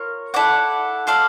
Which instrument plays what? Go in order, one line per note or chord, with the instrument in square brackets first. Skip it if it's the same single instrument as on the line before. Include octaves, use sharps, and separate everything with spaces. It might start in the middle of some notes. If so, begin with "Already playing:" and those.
Already playing: [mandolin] F4 A#4 C#5
E4 A4 D5 F#5
F4 A4 D5 F5